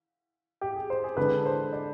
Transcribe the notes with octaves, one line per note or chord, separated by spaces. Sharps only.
G4
G#4
C5
G#4
D3 G#3 D4 B4
C5
D5